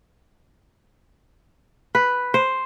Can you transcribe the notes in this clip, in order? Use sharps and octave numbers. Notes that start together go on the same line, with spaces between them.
B4
C5